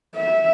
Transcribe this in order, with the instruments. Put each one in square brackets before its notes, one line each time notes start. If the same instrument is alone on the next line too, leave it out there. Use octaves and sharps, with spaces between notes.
[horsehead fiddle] E5